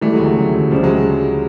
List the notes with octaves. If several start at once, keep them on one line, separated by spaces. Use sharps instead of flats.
E3 G3 A3
F#3 G#3
D2
F#3
C#3
D2
C#3 F3 G3
F#3 G#3